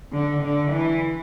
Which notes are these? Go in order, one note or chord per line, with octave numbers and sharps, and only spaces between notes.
D3
D3
E3